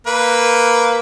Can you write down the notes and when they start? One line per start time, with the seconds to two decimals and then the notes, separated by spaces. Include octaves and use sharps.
0.07 A#3 B4